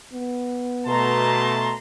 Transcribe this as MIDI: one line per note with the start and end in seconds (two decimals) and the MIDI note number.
0.14 1.66 59
0.87 1.74 47
0.87 1.74 57
0.87 1.74 81
0.87 1.77 82
0.87 1.77 84